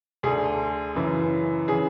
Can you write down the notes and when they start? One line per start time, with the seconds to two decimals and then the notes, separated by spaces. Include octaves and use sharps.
0.23 D2 D3 G#4
0.95 F#2 C#3 E3
1.68 C#3 E3 G#4